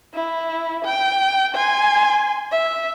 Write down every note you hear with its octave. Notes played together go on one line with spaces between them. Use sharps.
E4
G5
G#5 C6
E5